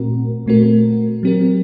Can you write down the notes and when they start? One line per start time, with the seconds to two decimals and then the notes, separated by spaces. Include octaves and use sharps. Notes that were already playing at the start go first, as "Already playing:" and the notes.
Already playing: A#2 A3 C4 F#4 A#4
0.46 A#2 A3 C4 F#4 A#4
1.23 F#3 C4 G4 A#4